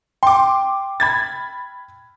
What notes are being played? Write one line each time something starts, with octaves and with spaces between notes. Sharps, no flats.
G5 C6 D6
B5 G#6 A6